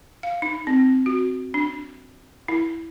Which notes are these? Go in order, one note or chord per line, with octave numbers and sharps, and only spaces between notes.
F5
D#4
C4
F#4
D4
E4